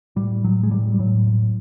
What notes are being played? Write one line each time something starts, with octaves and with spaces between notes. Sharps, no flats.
A2 G3
A2 F#3
G#3
A2 G3
G3
A2 F#3
A2